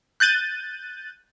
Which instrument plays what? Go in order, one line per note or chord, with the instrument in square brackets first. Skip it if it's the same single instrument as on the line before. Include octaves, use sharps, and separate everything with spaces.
[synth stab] F#6 G6 A6 D#7